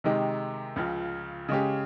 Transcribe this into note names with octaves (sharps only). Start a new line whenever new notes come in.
C3 D#3 G#3 D#4 G4
C#2 C#3 F3
C#3 G#3 C#4 G4